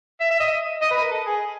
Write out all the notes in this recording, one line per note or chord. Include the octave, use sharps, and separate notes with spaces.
E5
E5
D#5
D#5
B4
A#4
A4
G#4